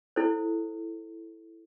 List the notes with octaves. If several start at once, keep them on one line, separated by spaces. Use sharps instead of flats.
E4 A4 C5